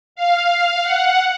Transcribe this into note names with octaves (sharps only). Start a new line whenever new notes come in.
F5
F#5